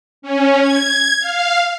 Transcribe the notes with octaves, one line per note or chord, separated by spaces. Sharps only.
C#4
G#6
F5